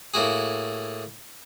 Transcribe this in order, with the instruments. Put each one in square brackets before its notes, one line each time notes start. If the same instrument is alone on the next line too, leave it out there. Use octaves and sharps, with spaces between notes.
[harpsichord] A2 A#3 E4 F#4 G#4